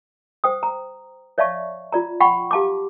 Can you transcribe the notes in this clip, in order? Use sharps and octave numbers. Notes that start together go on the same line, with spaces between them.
C5 G5 D#6
A#5
C#5 D5 E5 F5 A5 C#6
F4 D5 A#5
F#5 G5 B5 C#6
G4 F5 A5 A#5 D6